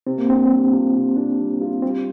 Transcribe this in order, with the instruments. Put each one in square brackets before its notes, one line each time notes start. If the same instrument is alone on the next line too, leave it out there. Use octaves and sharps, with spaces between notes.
[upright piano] C3 [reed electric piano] C4
[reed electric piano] A#3
[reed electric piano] C4 [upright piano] D4
[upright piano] G3
F4
C3
D4
G3
F4
[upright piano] G3 [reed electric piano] C4